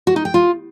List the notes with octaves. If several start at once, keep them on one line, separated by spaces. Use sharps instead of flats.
F#4
D#4
G5
F4